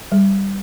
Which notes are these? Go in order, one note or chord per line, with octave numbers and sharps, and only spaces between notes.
G3